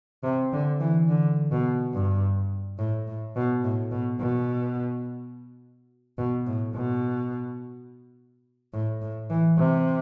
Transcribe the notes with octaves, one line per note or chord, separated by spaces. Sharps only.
C3
D3
E3
D3
B2
G2
A2
A2
B2
A2
B2
B2
B2
A2
B2
A2
A2
E3
C3